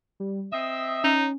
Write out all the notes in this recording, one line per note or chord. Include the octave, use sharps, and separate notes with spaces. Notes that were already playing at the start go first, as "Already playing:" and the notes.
G3
C4 D#5 E5 D#6
C#4 D#4